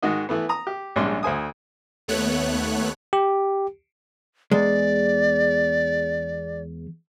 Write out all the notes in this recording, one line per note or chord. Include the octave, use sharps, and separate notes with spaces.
G#2 D#3 F#4 D#5
E3 A3 B3
A#5 D#6
G4
A#1 G#2 G3 C#4 D4 C6
D2 C5 G#5 D#6
D#2 A3 B3 C#5 F#6
G4
E2 G#3 D5